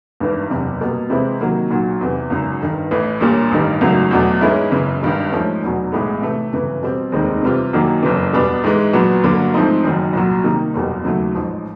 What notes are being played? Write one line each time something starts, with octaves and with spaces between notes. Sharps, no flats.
G#1 G2 E3
F#1 E2 C3
B2 G3 A#3
C3 E3 G#3 C4 E4
C3 D#3 F#3 A#3
B1 A#2 F#3
E2 C3 E3
G#1 F#2 C#3
G1 G2 D#3
A1 A2 E3
A#1 A#2 G3 A#3 C#4
A1 G2 D#3 G3
G#1 F#2 C#3 F#3 A3
E2 B2 F#3 A3 D4
G#2 E3 G#3 C#4 E4
F#1 F#2 C#3 E3
G#1 G2 D#3 G3
G#2 F3 A3 C#4
F1 E2 B2 F#3
B1 A2 E3 G#3 B3
C3 E3 A3
G1 F#2 C#3 E3
B2 G3 C4
F1 D#2 D#3 G#3 C4
C3 E3 G3 C4 F4
F#2 D#3 F#3 A#3 D4
F#1 F2 C#3 E3
E2 B2 G3 B3 D4
G#2 E3 G#3
A#2 F#3 B3 D4
G2 D3 F#3 A#3 D4
G#2 F3 A3 C4 D#4
F#1 F#2 D#3 F#3
C2 A#2 F#3
C3 D#3 G3 A#3 D#4
F#1 E2 B2 G3
D#2 C#3 F#3 A3
A1 G#2 F3